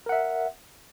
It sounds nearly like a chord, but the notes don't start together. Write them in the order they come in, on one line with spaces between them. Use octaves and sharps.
A#4 F#5 E5